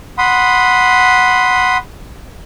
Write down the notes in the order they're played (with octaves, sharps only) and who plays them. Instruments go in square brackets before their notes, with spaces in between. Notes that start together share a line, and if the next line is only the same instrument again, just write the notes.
[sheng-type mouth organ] F#5 B5 C6 D#6